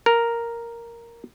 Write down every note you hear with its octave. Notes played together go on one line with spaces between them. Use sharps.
A#4